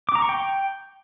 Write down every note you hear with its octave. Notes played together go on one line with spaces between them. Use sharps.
D6
A#5
C#6
G5